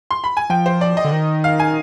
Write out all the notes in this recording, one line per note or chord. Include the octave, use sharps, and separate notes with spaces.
C6
B5
G#5
F3 G5
C5
D5
D#5
D3
D#3
F5
G#5